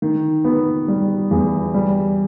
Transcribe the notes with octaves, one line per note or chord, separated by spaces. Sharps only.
D#3
B3
G3
E2
G3